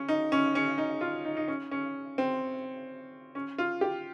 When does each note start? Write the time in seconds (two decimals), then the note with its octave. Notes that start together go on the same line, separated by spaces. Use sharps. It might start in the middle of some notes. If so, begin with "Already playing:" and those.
Already playing: C#4
0.09 D#4
0.32 C#4
0.55 C#4
0.78 D#4
1.01 F4
1.25 D#4
1.37 D#4
1.48 C#4
1.71 C#4
2.18 C4
3.35 C#4
3.58 F4
3.81 G4